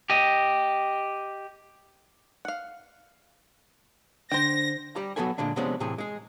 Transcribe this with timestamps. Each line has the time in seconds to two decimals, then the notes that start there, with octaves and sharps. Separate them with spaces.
0.10 G4 D#5
2.45 F5 F#5
4.31 D3 C5 G5 A#6
4.96 G3 G4 A#5
5.16 F#3 B3 F#4 A4 B4 G#5
5.38 A#2 D3 G#3 D4
5.56 C3 F3 G#3 B3 C#4 D4
5.80 A2 C3 E3 G#4
5.98 G#3 G#4